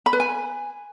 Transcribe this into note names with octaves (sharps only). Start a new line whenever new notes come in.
B5
B4
G#5